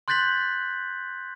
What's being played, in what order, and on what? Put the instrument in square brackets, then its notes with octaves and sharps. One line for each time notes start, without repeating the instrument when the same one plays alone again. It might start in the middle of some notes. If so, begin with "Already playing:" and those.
[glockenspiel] C6 F#6 G6 A6 B6 F#7